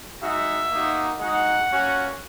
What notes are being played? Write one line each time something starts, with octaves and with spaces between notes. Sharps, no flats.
G#3 D#4 F#4 E5
A#3 D#4 F#4
G#3 D#4 F#4 F#5
A#3 C#4 F#4